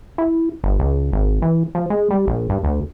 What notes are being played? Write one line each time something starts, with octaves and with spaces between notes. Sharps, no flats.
E4
G1
C#2
G#1
E3
F3
G#3
G3
A#1
G2
D2